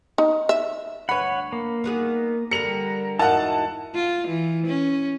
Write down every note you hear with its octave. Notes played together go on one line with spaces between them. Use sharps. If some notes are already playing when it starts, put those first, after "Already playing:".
D#4
E5
D2 B4 C#5 F#5 B5
A#3
D#3 B3 G#4
D3 G3 A#4 C#7 F7
E2 G#2 D#4 E4 F#4 A#4 F#5 A5
F4
E3
C#4